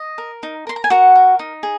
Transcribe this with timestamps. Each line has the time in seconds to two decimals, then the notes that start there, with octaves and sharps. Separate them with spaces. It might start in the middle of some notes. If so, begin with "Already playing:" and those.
Already playing: D#5
0.18 A#4
0.43 D#4
0.67 A#4 C6
0.76 A#5
0.84 G#5
0.90 F#4 A#4 F#5
1.15 A#4
1.39 D#4
1.63 G#4